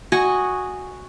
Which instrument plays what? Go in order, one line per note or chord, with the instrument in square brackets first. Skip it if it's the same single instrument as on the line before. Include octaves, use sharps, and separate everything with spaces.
[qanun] F#4 D#5 G#5 C#6